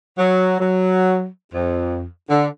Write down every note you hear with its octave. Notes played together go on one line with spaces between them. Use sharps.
F#3
F#3
F2
D3